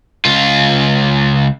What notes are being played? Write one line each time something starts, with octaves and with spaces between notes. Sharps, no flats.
C#2 F4